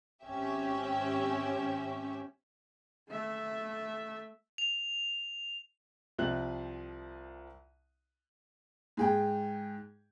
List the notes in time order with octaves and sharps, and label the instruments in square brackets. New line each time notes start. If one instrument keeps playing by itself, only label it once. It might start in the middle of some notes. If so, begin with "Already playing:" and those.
[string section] G#1 C4 C#4 G4 E5
[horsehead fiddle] A3 E5
[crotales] F7
[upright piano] C2 F3 C4 F#6 F#7
G#2 G#4 G5